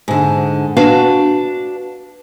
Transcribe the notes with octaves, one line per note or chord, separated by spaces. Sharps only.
G#2 D3
D4 F#4 B4 F5